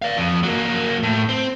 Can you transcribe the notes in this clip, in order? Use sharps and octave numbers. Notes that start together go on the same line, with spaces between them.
D5 F5
F2
F#3 A#3
A2
C4